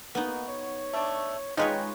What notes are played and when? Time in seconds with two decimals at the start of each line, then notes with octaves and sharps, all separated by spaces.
0.15 A#3 B3 D#4 F#4
0.49 C#5
0.94 A3 D4
1.57 G#3 C#4 D#4 F4 B4 C#5 G5